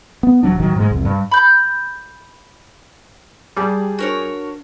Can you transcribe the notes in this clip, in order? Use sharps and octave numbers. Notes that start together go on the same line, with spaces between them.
B3
D#1 F3 F#3 D4
A1 D#3 F#3
G#2 F3 G#3
C2 F2
G2
B5 G6
G3 G4 G#4 A5
D4 F#4 A#4 C#5